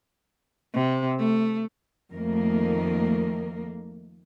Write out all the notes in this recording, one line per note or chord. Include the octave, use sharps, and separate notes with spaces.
C3
A3
F2 D#3 A3 A#3 A#4